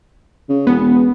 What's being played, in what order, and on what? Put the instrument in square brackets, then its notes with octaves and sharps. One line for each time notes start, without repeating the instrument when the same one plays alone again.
[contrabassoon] C#3
[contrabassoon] E1 [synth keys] B3